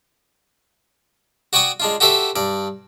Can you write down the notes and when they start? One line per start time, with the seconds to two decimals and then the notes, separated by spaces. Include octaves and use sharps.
1.53 F#4 D5 G5 C#6 D#6
1.80 G#3 D4 F4
2.00 F#4 G4 A4 C5 E5
2.36 G2 D5